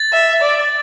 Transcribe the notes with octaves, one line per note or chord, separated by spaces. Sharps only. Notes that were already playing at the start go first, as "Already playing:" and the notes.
Already playing: A6
E5
D5